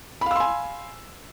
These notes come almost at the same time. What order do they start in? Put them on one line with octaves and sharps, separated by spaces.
B5 F5 E6 C6 G#5